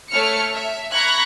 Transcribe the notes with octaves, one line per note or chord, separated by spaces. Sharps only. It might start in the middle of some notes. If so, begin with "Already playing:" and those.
A3 C#5 F6 C#7
E5
A#5 B5 C#6 F#6 G#6